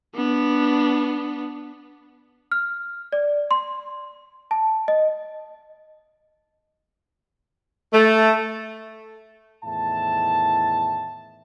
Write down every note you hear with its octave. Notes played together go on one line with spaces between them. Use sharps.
B3 D4
F6
D5
C6
A5
D#5
A3
E2 A2 D#3 E5 A5